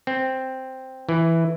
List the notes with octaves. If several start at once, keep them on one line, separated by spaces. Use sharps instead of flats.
C4
E3